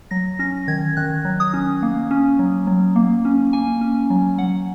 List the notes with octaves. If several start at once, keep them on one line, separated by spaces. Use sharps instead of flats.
F#3 A#6
C#4 A#6
D#3 G#6
D#3 F#6
F#3
D#6
C#4
A#3
C#4
F#3
F#3
A#3
C#4
A#3 G#5
C#4
F#3
F#3 F#5